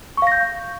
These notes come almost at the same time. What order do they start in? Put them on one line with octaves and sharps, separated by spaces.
C#6 F5 A#6 G6